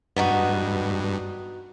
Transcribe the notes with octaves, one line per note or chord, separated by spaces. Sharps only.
G2 B3 D#4 F#4